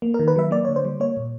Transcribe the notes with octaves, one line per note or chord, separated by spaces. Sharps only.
A#3
A#4
D#3
B4
F#3 E5
A#3 D5
D3 C#5
C5
G3
A#3 C#5
A#2